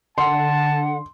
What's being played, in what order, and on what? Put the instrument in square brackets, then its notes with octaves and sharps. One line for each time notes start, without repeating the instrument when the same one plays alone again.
[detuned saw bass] D3 [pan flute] F#5 [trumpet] A5 [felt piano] C6